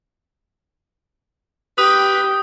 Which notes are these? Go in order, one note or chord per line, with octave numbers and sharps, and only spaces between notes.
G4 B4 G5 D#6